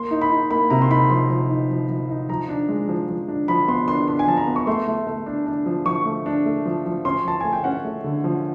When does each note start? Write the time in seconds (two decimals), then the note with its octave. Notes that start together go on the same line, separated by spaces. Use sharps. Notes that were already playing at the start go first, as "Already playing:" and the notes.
Already playing: A#3 C6
0.11 D#4
0.21 B5
0.31 D#4
0.51 A#3 B5
0.70 C3 A#5
0.82 C6
0.90 D#4 B5
1.10 F3 C6
1.30 F3
1.50 D#4
1.70 F3
1.89 F3
2.09 D#4
2.29 F3 A#5
2.49 D4
2.69 G#3
2.88 F3
3.09 F3
3.28 D4
3.48 F3 B5
3.68 B3 C6
3.88 D4 C6
4.08 D4 C6
4.19 G#5
4.27 F3 A5
4.37 A#5
4.47 B3
4.56 C#6
4.67 A3 C6
4.88 A3
5.07 A3
5.26 D4
5.46 D4
5.66 F3
5.86 F3 C#6
6.06 A3
6.26 D4
6.46 A3
6.65 F3
6.86 F3
7.05 C#4 C6
7.25 F3 A5
7.40 A3 G#5
7.53 G5
7.64 C#4 F#5
7.85 A3
8.04 D3
8.24 F3